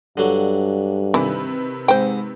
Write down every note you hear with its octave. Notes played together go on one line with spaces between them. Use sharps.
G2 D3 F#3
C3 D#3 E3 E4 B4
G#2 C5 G5